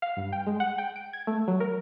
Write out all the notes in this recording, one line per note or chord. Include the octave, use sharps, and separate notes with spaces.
F5
G2
G5
G#3
F#5
G5
D7
G#6
A3
F#3
A#4